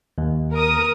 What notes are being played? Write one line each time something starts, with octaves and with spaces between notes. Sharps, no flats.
D#2
A#4 D#6